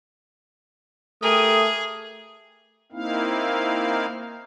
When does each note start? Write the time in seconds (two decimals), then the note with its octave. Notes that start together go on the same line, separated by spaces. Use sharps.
1.23 A3 G4 G#4 A#4 D#6
2.92 A#3 C4 D#4 E4 F5